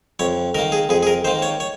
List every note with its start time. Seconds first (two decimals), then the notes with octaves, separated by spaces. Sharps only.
0.19 F2 C#5
0.55 D#3 A#3 A#4
0.72 G#4
0.89 F2 G#4
1.03 G#4
1.07 A#4
1.24 D#3 C5
1.27 A#3
1.42 C#5
1.60 C#5